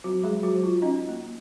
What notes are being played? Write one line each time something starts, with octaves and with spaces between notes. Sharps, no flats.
F#3 C4 F#4
G#3 G#4
F#3
F#3 F#4
F#3
F4
C#4 D#4 D#5
A#3